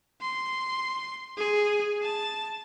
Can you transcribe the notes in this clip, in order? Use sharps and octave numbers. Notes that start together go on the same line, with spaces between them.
C6
G#4
A5